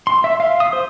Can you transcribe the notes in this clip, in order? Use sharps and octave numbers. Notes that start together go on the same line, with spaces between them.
C6
E5
F5
D#6
C5